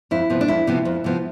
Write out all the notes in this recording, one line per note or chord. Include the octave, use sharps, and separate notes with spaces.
F2 E4
C3 F3 B3
D4
F2 E4
C3 F3 B3
F2
C3 F3 B3